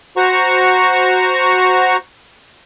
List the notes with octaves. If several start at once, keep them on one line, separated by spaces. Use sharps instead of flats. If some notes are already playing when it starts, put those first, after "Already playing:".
F#4 C5 F#5 A#5 C#6